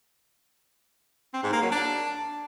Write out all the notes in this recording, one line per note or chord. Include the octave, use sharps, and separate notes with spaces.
C4
G#2
A#3
F#3
D4